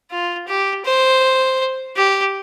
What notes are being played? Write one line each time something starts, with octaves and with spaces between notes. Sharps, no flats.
F4
G4
C5
G4